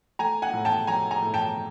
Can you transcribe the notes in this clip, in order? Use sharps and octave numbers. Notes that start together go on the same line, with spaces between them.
A3 G#5 A#5
F#5 G#5
A2
G5 A5
F#3 G#5 A#5
G#5 A#5
A2
G5 A5